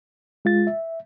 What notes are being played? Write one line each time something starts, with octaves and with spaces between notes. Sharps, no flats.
G#3 F4 A6
E5